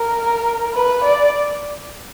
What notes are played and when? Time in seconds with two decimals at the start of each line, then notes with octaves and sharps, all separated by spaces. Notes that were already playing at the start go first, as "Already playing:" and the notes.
Already playing: A#4
0.75 B4
1.05 D5